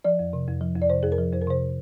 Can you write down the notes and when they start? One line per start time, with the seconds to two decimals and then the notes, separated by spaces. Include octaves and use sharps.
0.04 F3 D5
0.19 F2
0.33 C3
0.48 F2
0.61 F3
0.76 F2
0.82 D5
0.90 C3 C5
1.03 F2 G#4
1.12 A#4
1.18 F3
1.33 F2 C5
1.42 A#4
1.47 C3 C5